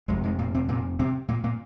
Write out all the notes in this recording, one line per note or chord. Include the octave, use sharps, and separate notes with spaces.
F1 F2 G#2 C3 G#3
G#2 G#3
A#2 A#3
C3 C4
A#2 A#3
C3 C4
A#2 A#3
A#2 A#3